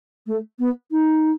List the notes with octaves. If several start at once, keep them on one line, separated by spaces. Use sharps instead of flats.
A3
B3
D#4